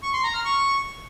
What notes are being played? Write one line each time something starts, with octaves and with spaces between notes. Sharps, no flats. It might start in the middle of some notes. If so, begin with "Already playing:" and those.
C#6
C6
A#5
F6
C#6